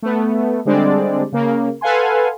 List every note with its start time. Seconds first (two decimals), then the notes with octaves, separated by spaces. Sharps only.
0.02 A3 B3
0.65 D3 G3 G#3 C4 D4 D5
1.32 C#3 A#3
1.81 A4 B4 F5 F#5 G#5 C6